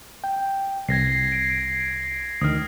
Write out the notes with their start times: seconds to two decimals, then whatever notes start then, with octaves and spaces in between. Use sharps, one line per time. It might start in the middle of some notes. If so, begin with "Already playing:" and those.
0.24 G5
0.89 C2 G#6 A#6 C7
1.32 D7
2.41 D2 D#3 D#6 F6